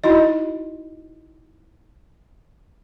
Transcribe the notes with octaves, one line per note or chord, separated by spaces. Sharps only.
D#4 E4 F#4 D#5